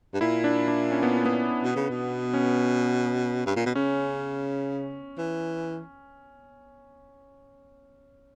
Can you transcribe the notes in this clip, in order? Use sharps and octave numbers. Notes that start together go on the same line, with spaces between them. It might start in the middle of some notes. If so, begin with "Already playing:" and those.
G2
A#2 E4
D4
D4
C#4
B3
B3
B2
C#3
B2
C#4
G2
A#2
B2
C#3 C#4
E3